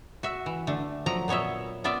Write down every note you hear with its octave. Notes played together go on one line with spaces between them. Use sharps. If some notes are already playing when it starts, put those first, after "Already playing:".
F#4 E5
E3
D3 A3
F3 F#3 A#5
A#2 B3 C#5 D#5 E5
B3 F4 D5 E5